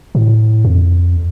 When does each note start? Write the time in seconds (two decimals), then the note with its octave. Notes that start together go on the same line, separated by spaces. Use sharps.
0.15 A2
0.64 F2